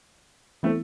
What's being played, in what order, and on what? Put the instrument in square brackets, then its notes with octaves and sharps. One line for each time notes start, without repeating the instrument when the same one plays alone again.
[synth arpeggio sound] E3 B3 E4 [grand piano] A3 C4